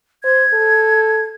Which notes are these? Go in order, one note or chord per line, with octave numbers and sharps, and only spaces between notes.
C5 G#6
A4